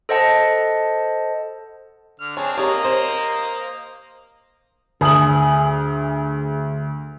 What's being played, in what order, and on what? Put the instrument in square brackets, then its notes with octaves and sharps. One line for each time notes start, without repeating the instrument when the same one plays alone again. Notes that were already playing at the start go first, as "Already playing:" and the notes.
[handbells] A4 C5 D#5 F#5 A5
[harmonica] D3 F6
[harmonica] C4 D4 G#4 [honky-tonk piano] C#5
[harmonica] A#3 D#5 A#5 [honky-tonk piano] G4 C#5
[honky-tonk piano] C5
[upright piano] D2 F#7 [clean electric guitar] G#4